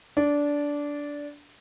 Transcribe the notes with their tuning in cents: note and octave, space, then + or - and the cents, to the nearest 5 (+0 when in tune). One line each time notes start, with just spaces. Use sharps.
D4 -15